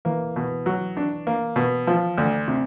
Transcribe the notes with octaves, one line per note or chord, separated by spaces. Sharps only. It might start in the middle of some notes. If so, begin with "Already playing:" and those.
E3 A#3
B2
F#3
D4
A#3
B2
F3
D2
C3